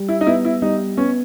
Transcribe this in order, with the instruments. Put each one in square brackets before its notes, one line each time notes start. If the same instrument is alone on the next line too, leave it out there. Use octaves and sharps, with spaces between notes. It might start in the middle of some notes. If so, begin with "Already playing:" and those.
Already playing: [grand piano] G3
[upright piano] E4
D#4
[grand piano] B3 [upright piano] E4
[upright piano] E4
[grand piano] G3 [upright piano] D#4
[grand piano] B3 [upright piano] C#4